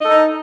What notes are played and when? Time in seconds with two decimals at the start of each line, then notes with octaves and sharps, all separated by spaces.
0.01 D#5
0.05 A4
0.09 D#4